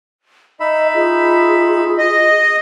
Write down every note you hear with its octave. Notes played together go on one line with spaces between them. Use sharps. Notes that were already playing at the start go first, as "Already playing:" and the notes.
D#4 D#5 E5 B5
F4 G#4
D#5